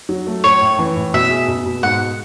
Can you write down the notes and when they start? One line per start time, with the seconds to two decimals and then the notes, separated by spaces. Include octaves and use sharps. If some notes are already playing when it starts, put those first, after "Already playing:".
0.09 F#3
0.27 A3
0.44 A2 C#5
0.61 A2
0.79 E3
0.96 A2
1.14 B2 E5
1.31 G#4
1.48 B2
1.66 B2
1.83 G#2 F#5